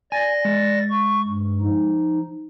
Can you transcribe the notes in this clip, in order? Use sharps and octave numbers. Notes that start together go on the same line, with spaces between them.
D5 G#5 A6 A#6
G#3
C#6
G2
F3 D#4